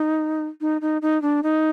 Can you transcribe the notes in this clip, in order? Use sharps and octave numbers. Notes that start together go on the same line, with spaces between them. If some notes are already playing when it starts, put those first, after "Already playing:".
Already playing: D#4
D#4
D#4
D#4
D4
D#4